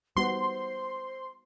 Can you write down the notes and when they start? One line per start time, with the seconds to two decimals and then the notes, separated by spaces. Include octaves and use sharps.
0.17 G3 B3 D#4 F#4 C5 C6